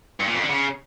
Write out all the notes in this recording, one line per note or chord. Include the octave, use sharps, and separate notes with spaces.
G2
A#2
F2
D3
C#3